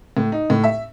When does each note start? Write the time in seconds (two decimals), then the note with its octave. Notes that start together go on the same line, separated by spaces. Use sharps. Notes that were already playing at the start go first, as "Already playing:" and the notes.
0.17 A2
0.32 D#4
0.50 A2
0.64 E5